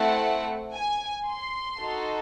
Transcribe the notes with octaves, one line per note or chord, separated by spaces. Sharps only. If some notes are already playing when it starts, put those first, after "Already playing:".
Already playing: A3 C4 E4 A4 F#5
G#5
C6
D#4 F#4 A4